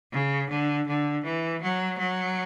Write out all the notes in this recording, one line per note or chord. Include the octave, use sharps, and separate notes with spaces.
C#3
D3
D3
E3
F#3
F#3